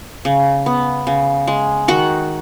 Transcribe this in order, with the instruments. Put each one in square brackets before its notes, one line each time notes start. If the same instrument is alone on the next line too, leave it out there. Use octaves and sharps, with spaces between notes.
[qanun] C#3
B3
C#3
G#3
D#3 F#4 F#5